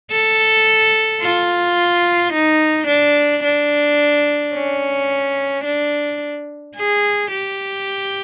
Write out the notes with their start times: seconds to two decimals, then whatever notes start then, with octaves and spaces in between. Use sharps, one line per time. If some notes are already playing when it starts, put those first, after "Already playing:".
0.11 A4
1.21 F4
2.33 D#4
2.87 D4
3.44 D4
4.54 C#4
5.65 D4
6.76 G#4
7.32 G4